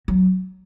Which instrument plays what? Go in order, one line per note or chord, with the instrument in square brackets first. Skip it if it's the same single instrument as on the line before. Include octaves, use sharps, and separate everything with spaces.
[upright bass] F#3